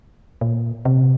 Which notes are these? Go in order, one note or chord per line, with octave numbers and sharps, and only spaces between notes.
A#2
C3